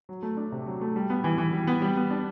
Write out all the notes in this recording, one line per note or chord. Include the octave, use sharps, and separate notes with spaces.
F#3
A3
D4
C3
F#3
A3
G3
B3
E3
E3
G3
B3
G3
B3
D4